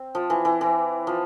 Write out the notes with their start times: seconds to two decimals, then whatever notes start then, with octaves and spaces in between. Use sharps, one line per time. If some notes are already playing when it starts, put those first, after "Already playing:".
Already playing: C4
0.15 F3
0.30 E3
0.45 E3
0.61 E3
1.07 F3